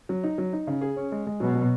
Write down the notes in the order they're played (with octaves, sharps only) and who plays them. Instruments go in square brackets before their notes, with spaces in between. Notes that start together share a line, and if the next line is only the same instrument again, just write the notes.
[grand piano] F#3
D#4
F#3
D#4
C#3
G#4
C#4
G#3
G#3
[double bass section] B2 [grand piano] F#3
[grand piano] F#3